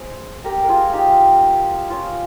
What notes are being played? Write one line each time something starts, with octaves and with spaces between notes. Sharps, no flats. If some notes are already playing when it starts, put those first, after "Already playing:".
Already playing: G#4 C5
G4 A#4
A#4
F4 G#4
D#4 G4
C#4 F4